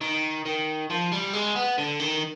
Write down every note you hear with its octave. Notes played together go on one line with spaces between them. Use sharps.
D#3
D#3
F3
G3
G#3
B3
D3
D#3